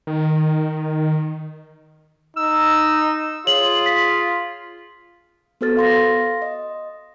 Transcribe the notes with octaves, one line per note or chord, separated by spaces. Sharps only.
D#3
D#4 E6
F4 G#4 C#5 F#7
B6
B3 F#4 A4 C5 F6 A6
F5 C6 A#6
D#5